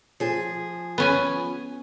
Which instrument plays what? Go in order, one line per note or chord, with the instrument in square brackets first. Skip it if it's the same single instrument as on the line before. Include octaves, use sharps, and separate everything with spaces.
[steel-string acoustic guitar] F3 G#4
[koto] B3 C#4 G#5